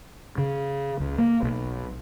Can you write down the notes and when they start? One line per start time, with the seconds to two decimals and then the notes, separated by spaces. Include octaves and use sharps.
0.38 C#3
1.00 C#2
1.18 A#3
1.43 B1